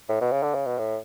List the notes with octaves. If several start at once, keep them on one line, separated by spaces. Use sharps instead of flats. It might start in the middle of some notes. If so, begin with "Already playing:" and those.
A2
B2
C#3
D3
C#3
B2
A2